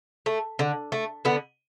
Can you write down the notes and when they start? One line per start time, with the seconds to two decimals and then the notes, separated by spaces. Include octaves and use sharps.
0.26 A3
0.59 D3
0.92 A3
1.25 D3 B3